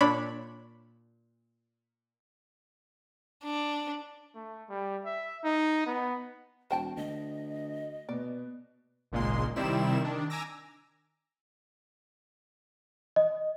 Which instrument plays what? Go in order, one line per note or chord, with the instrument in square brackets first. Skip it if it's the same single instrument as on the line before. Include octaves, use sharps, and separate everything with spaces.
[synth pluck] A#2 D4 C#5 B5
[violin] D4
[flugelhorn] A3
G3
E5
D#4
B3
[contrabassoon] E1 [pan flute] F#4 [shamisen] C5 G5 A5
[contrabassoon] D2 [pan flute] D#5
[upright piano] B2 B3 [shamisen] D5
[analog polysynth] G#1 C#2 A#2 G#3 A#3 C6
C3 D#3 G3 C4 E4 E7
D#3 D4
G#5 A#5 D6 E6 A#6
[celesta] D#5